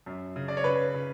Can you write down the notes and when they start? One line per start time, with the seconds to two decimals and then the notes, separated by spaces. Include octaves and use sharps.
0.06 F#2
0.36 C#3
0.48 D5
0.57 C#5
0.64 C#3 B4
0.94 C#3